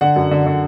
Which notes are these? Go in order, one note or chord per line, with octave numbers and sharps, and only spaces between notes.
D3 F#5
F#2
D3
D3